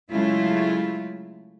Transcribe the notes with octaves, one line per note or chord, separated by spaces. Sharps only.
C#3 F#3 G#3 A3 E4 F4